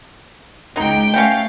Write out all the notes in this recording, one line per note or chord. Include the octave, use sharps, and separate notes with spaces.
C#2 F#3 D#4 G5
A3 C#4 F#4 F5 G5